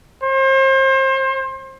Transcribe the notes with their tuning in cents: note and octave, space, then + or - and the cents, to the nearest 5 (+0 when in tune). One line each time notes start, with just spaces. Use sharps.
C5 +35